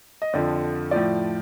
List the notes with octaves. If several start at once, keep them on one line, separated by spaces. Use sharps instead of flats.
D#5
F2 D3 F3 D5
A2 F3 D5